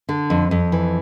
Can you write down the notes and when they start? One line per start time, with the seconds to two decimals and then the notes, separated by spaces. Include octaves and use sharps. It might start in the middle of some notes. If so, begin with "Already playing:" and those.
0.09 D3
0.30 F2
0.51 F2
0.72 E3